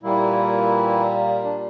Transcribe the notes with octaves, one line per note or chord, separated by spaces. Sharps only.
A#2 E3 G3 A#3 E4
D4